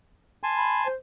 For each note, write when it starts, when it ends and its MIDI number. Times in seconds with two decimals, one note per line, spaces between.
0.43 0.87 80
0.43 0.87 81
0.43 0.87 84
0.57 0.85 83
0.86 0.95 72